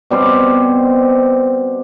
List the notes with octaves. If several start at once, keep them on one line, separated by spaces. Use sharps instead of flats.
B2 G3 C4 C5